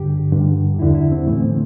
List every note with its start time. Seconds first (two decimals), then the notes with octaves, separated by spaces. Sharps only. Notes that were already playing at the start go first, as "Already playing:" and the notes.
Already playing: G2 D3 G4
0.33 G2 D3
0.79 E2 D3 E4
0.95 E4
1.12 C4
1.27 A2 E3 A3
1.43 C4